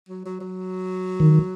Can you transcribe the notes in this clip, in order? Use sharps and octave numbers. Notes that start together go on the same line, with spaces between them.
F#3
F#3
F#3
D#3